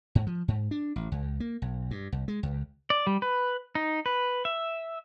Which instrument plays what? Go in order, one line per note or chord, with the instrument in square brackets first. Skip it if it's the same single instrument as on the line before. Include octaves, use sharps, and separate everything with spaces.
[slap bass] G#2
F3
G#2
D4
A1
C#2
A#3
B1
G2
C2
G#3
C#2
[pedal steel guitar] D5
G3
B4
D#4
B4
E5